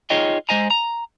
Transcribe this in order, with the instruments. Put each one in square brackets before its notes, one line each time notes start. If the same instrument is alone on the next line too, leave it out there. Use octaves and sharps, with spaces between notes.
[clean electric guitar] D#4 F4 G#4 C#5 D#5 G5
G#3 C5 D#5 G#5 A#5
A#5